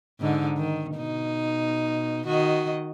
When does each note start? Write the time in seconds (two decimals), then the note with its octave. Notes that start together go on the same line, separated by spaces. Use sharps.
0.20 G#2 D3 D#4
0.57 D#3
0.97 B2 D#4
2.26 D#3 F#4 D#5